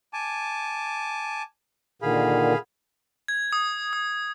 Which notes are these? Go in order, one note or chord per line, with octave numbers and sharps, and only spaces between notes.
G#5 A5 D6
A#2 D3 D#3 G#4 F5 B5
G#6
D#6
D#6